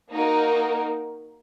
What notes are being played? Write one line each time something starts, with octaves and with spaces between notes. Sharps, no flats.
A#3 D#4 F#4 A#4